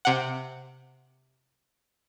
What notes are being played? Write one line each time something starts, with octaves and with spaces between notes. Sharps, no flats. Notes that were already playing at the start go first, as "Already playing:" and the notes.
C3 F#5